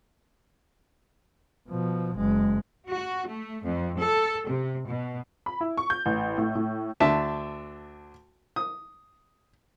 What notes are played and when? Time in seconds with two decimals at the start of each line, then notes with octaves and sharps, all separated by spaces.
1.69 B2 F3
2.17 F#1 G#3
2.89 F#4
3.27 A3
3.64 F2
3.98 A4
4.48 C3
4.86 B2
5.46 B5
5.61 E4
5.78 C#6
5.90 G6
6.06 A1
6.38 A2
6.55 A2
7.00 D2 D4 E5 A5
8.56 D#6